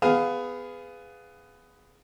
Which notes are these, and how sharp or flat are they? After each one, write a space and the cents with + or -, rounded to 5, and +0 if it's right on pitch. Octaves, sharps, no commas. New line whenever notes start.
B3 +15 G#4 -5 F5 +0